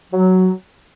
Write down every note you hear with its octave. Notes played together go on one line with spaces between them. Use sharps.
F#3